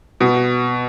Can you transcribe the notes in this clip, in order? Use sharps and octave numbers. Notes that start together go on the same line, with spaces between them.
B2